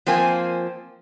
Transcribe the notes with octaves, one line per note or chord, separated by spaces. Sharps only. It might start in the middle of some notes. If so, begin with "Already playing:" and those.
F3 A#3 C4 G#5